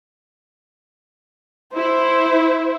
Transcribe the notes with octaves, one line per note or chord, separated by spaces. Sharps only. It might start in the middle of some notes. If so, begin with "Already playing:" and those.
E4 C5